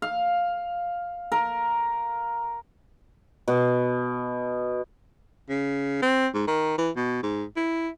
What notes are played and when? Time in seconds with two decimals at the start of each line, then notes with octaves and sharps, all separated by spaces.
0.02 F5
1.32 A#4
3.48 B2
5.49 C#3
6.02 C4
6.34 G#2
6.47 D#3
6.78 E3
6.96 B2
7.23 G#2
7.56 E4